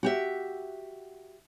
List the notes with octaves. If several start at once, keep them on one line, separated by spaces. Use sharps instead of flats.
F#4 G4 E5